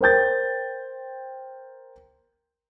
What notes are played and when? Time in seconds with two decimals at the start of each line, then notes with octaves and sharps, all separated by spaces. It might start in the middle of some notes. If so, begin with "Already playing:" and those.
0.01 A#4 C5 G5 G6 A6